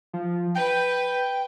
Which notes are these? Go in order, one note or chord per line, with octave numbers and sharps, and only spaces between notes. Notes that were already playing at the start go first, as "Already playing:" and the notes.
F3
B4 G5